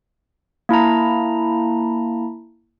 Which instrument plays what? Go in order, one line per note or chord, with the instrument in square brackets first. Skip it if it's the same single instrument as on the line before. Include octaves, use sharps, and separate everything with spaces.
[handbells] A#3 E4 A5 A#5